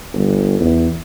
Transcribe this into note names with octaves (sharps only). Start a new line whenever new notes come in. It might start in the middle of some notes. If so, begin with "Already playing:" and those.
G1
E2